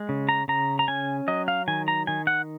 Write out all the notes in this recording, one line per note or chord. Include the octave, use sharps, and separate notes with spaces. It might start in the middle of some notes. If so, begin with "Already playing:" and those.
Already playing: G#3
C#3
A#5
C#3 A#5
A#5
C#4 G#5
F#3 D#5
F5
D#3 G#5
A#5
D#3 G#5
F#5